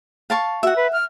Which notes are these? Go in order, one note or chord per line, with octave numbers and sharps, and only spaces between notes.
F5 A5 C#6
F#4 E5 F#5
B4
F6